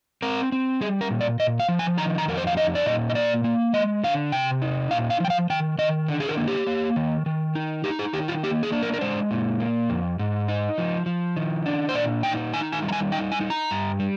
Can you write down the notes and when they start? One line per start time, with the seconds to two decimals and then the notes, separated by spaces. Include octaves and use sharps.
0.22 C4 A#4
0.52 C4
0.81 G3 G#4
1.01 A#4
1.11 A#2
1.21 D5
1.39 A#2 D#5
1.60 F5
1.69 F3
1.79 G#5
1.98 D#3 A#5
2.18 A#5
2.28 F2 A#4
2.37 C5
2.47 F5
2.57 D#4 D#5
2.75 D5
2.86 A#2 D#5
3.10 D#5
3.15 A#3 D5
3.44 A#3
3.73 G#3 D#5
4.04 D3 F5
4.32 C3 G5
4.62 D#4
4.91 A#2 F5
5.10 F5
5.20 F3 G5
5.30 F5
5.50 D#3 G5
5.78 D#3 D#5
6.08 D3
6.20 G#4
6.28 A#4
6.37 A#3
6.48 G4
6.67 A#3
6.96 D#3
7.26 D#3
7.55 D#4
7.84 D#4 G4
7.99 G#4
8.13 D#3 G4
8.28 F4
8.43 A#3 G4
8.63 G#4
8.72 D4
8.83 A#4
8.94 A#4
9.01 G#3 C5
9.31 A#2
9.60 A#3
9.90 F2
10.19 G#2
10.48 D#4
10.78 F3
11.06 F3
11.37 D#3
11.66 D4
11.89 C5
11.95 A#2 D5
12.23 D#4 G5
12.53 D#3 G#5
12.72 G#5
12.82 G3
12.88 A#5
12.92 G#5
13.12 D#4 G5
13.32 G#5
13.40 D#4
13.50 A#5
13.71 G2
13.99 G3